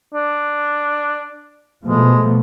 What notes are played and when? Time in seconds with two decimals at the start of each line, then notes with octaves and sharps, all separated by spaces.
0.14 D4
1.86 B2 F3 G#3 A3